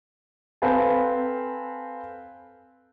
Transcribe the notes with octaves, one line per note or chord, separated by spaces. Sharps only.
C4 A4 B4 F5 G#5 A5